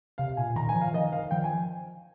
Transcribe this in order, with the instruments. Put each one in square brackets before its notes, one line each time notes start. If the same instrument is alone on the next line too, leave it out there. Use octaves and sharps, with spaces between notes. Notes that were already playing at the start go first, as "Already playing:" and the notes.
[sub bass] C3 [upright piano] F5
[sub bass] A#2 [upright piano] G#5
[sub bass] D#3 [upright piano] A#5
[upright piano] G#5
[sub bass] F3
[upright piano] F5
[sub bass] D#3 [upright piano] D#5
[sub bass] D#3 [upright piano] F5
[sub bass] F3 [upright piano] G5
[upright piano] G#5